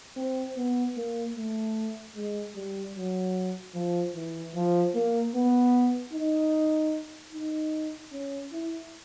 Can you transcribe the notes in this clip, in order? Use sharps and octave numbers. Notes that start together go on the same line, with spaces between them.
C4
B3
A#3
A3
G#3
G3
F#3
F3
E3
F3
A#3
B3
D#4
D#4
C#4
E4